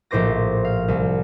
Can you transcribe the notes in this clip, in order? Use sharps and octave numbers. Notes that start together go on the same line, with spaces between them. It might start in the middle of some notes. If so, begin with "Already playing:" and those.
A#1 A2 C5 D6 A#6
F5
C2